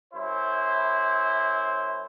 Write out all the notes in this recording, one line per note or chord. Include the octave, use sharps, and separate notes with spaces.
F#2 E4 C5